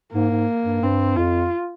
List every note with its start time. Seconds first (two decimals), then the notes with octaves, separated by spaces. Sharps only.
0.13 G#2 A#3
0.31 G#2
0.65 G2
0.82 G2 C4
1.16 F2 F4